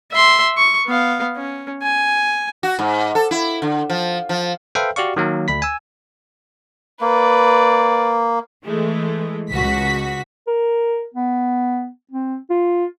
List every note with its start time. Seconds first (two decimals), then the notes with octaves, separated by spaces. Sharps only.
0.12 E5 C6
0.57 C#6
0.87 B3 F5
1.36 C#4
1.82 G#5
2.63 F#4
2.79 G#2
3.15 A4
3.31 E4
3.62 D3
3.90 F3
4.29 F3
4.75 A4 B4 C5 E5 F5 G5
4.96 F#4 G4 D5 F5 C#6
5.16 D#3 F#3 A#3
5.48 D2 B5 B6
5.62 G#5 E6
7.01 A#3 B4 D5
8.63 E3 G#3 A3
9.51 C#2 F#4 B6
10.47 A#4
11.14 B3
12.12 C4
12.50 F4